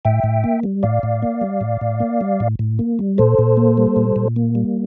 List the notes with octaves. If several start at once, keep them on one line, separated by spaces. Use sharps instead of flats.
A2 E5 G5
A2
A#3
G3
A2 D5 F5
A2
A#3
G3
A2
A2
A#3
G3
A2
A2
A#3
G3
A#2 A4 C5
A#2
A#3
G3
A#2
A#2
A#3
G3